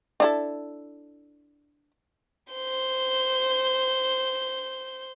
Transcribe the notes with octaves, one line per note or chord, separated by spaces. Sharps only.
D4 E4 A4
C5 G6